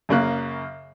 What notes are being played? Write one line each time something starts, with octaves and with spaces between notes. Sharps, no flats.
F#2 C#3 A#3 F#6